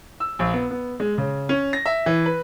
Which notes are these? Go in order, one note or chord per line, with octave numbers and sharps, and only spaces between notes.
E6
A#1
B3
B3
G#3
C#3
C#4
A#6
E5
E3
B4